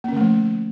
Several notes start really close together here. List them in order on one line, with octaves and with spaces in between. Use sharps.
A#3 C#4 D3 A3 F3